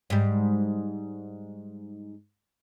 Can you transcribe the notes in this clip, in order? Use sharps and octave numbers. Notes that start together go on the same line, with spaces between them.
G#2 G3